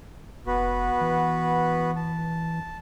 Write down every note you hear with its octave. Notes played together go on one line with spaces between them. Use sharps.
F1 B3 F#4 B4
E3
A5